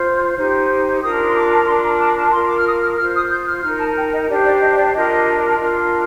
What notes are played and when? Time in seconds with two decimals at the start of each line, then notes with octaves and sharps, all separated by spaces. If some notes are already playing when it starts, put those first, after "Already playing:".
Already playing: F4 C5
0.37 D#4 G4 C5
1.01 D4 F4 A#4 D#6
1.27 C6
1.35 D6
1.62 D6
1.67 D4 F4 A#4 C6
1.83 A#5
1.99 A5
2.16 A5
2.32 F4 A#4 C6
2.48 D6
2.57 F6
2.66 D#6
2.81 F6
2.97 F4 C5 F6
3.15 D#6
3.31 G6
3.47 F6
3.63 D#4 F6
3.67 A#4
3.79 A5
3.96 G5
4.12 D#5
4.28 D4 G4 C5 D5
4.44 D5
4.60 D#5
4.77 D5
4.93 D4 F4 A#4 D#5
5.59 D4 F4 A#4